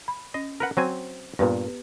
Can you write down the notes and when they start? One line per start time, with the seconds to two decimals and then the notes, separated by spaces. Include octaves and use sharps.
0.08 B5
0.34 C#4 D#5
0.60 A#4 B4 F#5
0.77 F#3 C4 C5 G#5
1.39 G2 A#2 B3 G4 B4